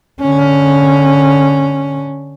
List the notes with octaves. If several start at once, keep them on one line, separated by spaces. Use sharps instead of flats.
D3 C#4